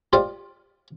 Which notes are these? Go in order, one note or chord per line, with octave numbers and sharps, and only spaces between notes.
F4 G4 C5 D5 D#5 F5